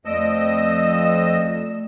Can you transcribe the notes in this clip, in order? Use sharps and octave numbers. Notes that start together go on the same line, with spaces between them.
F2 A3 D5 D#5 E6